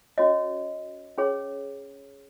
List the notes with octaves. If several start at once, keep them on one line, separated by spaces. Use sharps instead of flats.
C#4 F#4 C#5 D#5
C#4 G#4 C#5